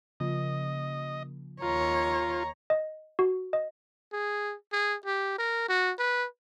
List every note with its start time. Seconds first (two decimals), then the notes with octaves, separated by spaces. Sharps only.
0.20 C#3 F3 A#3 D#5
1.62 D#2 F4 C#5 A#5
2.70 D#5
3.19 F#4
3.53 D#5
4.13 G#4
4.72 G#4
5.06 G4
5.38 A#4
5.69 F#4
5.99 B4